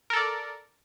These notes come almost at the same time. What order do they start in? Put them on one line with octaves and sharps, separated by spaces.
A#4 A4 D5